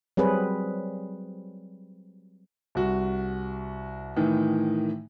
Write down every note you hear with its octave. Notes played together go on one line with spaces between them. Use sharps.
F#3 G3 C4 G#4 B4
C2 F#4
A2 D#3 E3